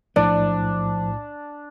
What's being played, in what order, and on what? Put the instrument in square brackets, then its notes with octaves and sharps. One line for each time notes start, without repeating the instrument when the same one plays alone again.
[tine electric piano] B1 A2 [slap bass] F3 [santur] D4 [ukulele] D5